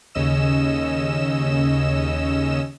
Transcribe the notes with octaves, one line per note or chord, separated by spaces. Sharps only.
D#2 C#3 C#4 D#5 E6 E7